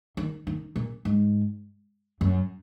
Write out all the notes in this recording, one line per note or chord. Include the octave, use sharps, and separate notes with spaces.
D#3
D#3
A#2
G#2
F#2